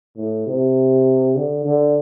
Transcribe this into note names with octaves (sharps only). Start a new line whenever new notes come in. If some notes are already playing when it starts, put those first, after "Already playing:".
A2
C3
D3
D3